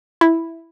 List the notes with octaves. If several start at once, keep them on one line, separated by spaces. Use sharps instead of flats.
E4